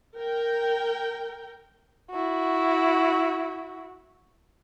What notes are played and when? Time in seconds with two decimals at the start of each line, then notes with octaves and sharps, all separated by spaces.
0.14 A#4 G5
2.11 E4 F#4